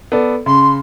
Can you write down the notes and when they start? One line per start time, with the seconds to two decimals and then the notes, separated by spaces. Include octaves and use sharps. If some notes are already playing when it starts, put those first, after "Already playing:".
0.12 B3 A4 D5
0.46 C#3 C6